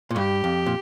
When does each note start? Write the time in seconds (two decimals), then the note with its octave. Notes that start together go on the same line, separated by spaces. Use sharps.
0.11 A#2
0.15 G2 G4
0.44 F2
0.66 A#2